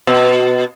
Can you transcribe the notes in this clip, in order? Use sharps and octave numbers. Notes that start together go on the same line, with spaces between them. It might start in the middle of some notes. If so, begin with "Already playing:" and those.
B2